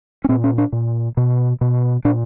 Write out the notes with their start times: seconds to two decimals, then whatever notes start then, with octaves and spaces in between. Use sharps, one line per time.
0.24 C#4
0.29 A#2 C4
0.44 C#4
0.58 D4
0.72 A#2
1.17 B2
1.61 B2
2.05 A#2 D4